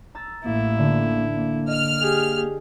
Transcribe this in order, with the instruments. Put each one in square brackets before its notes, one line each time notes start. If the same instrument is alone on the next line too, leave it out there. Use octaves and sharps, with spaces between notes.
[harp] A#5 E6 A6
[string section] A1 [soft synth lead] A#3 [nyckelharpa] E4
[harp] D3
[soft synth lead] A#3
[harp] D#5 [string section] F6
[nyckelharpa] G4 G#4